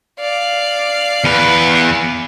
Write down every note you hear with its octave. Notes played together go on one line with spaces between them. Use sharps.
D5 F5
E2 B4